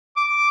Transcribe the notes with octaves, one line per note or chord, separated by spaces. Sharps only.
D6